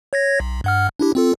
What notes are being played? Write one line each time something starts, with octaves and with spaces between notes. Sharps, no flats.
C#5 G#6 A#6
B1
G2 F#5 F6
D4 E4 G4
C4 F4 A4